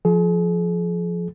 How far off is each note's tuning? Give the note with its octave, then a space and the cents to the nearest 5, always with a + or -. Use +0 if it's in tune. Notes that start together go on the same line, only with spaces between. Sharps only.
F3 +0 G#4 +40